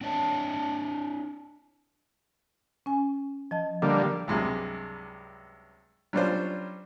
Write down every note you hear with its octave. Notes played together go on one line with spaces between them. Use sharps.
C4 D4 C#5 D5 E5 A5
C#4 G#5
F3 D#5 A5
D3 G3 A#3
C#2 G2 C3 F#3 G#3
F#3 G3 C#4 D4 F4 C5